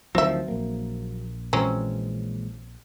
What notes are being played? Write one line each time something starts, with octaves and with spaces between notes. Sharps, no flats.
D2 D#3 F3 F#3 C4 E5
A#1 A#3
A#2 E3 F#3 G#3 C4 C#4